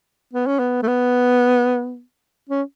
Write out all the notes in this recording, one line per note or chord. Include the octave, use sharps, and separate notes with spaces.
B3
C#4
B3
A3
B3
C#4